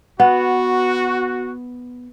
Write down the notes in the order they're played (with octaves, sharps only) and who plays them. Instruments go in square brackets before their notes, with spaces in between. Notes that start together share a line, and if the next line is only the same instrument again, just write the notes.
[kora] B3 [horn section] F#4